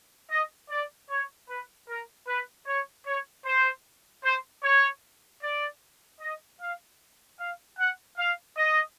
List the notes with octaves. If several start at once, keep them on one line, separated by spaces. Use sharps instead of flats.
D#5
D5
C#5
B4
A#4
B4
C#5
C#5
C5
C5
C#5
D5
D#5
F5
F5
F#5
F5
D#5